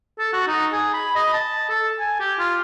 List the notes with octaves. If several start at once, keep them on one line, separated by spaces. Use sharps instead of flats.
A4
F#4
D#4
G#4
B5
D#5
A5
A4
G#5
G4
F4